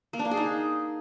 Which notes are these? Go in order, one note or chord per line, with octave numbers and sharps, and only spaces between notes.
A#3
D4
A#3
G#4
D#4